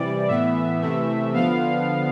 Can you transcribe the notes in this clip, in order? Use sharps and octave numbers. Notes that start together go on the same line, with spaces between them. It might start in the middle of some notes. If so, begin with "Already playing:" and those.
Already playing: C3 E3 G3 D5
A2 E3 B3 E5
C3 E3 A3
D3 F3 B3 F5